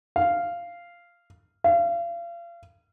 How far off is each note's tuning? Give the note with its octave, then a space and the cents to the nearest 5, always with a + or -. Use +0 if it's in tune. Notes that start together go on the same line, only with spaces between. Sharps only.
F5 -10
F5 -35